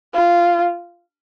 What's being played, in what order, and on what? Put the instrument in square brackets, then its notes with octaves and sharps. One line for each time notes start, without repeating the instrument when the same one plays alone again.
[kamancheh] F4